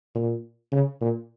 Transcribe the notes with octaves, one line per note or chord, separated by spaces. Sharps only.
A#2
C#3
A#2